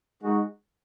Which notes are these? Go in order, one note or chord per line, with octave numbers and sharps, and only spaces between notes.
G#3 D#4 F#4